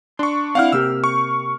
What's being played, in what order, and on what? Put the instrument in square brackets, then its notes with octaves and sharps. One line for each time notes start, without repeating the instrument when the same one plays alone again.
[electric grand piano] D4 C#6 [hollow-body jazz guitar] C6
[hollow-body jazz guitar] C4 D4 E4 [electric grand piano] F5 F#5 F6
[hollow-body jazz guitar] C3 A#3 G4 [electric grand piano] E6
[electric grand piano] C#6